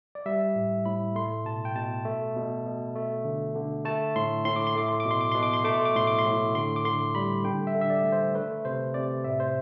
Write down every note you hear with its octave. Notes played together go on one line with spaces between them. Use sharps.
D5
G3 E5
A2
A2 B5
A3 C6
B2 A5
G5
B2 A5
A3
B2
B2
A3
D3
D3
A3 A5
A2 C6
A2 C6
D6
C6
A3 D6
C6
D6
B2
C6
D6
B2 C6
D6
C6
A3 D6
C6
D6
A2 C6
D6
C6
A2
D3 C6
D6
D3 C6
G3 B5
D3 G5
E5
D3
E5
D5
A3
C5
A3 B4
C3 C5
C3 D5
A2 E5
C5